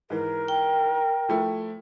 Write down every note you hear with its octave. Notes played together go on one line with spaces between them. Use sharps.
G#2 E3 A#4
G5
F3 A3 E4